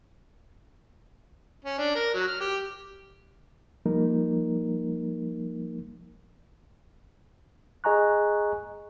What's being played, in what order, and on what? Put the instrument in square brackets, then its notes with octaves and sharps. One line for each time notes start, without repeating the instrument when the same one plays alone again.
[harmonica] C#4
D4
A#4
F#3
F6
G4
[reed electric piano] F3 G3 A#3 D#4 A#4
[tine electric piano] G#4 D#5 G#5 A#5 C#6 F#6